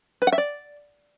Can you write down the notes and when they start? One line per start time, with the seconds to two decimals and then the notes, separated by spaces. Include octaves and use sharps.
0.22 B4
0.27 F#5
0.32 E5
0.38 D5